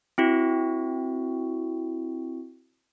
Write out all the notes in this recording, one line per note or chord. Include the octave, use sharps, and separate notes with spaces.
C4 E4 F#4